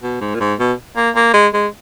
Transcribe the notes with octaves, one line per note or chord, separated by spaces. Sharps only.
B2
G#2
A#2
G#2
B2
A#3
A#3
G#3
G#3